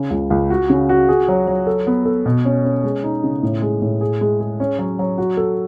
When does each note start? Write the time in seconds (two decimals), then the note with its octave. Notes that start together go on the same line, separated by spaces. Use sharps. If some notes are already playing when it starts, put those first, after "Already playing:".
Already playing: C#3
0.10 C#2
0.30 C#2
0.50 F#4
0.70 C#3
0.89 F#4
1.08 G#4
1.28 F#3
1.48 F#3
1.67 A4
1.87 B3
2.06 A4
2.26 B2
2.45 C#4
2.65 C#4
2.84 G#3
3.04 D#4
3.24 C#3
3.43 A2
3.62 G#3
3.82 A2
4.01 G#4
4.21 G#3
4.40 G#4
4.60 C#4
4.79 F#3
4.99 F#3
5.18 F#4
5.37 A4